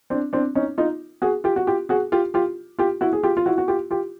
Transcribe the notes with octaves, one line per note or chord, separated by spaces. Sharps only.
C4 D4
C4 D4
C#4 D#4
D#4 F4
F#4 G#4
F4 G4
F#4
F4 G4
F#4 G#4
F4 G4
F4 G4
F4 G4
E4 F#4
G#4
F4 G4
F4
E4 F#4
F#4
F4 G4
F4 G4